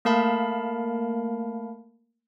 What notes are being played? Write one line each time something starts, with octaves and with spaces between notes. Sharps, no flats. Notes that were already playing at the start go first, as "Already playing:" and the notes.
A3 A#3 A#4 F5 A5 B5